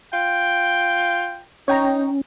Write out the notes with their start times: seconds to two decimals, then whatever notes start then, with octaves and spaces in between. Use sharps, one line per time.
0.13 F4 G5
1.68 C#4 D#4 C#5 G5 A#5